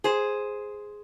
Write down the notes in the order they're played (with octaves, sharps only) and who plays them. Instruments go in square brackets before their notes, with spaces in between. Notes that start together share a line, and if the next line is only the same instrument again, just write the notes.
[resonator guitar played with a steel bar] G#4 C5